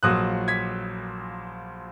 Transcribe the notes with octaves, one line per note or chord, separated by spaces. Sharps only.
A#1 A#2 F#3 D#6 F#6
G#6 B6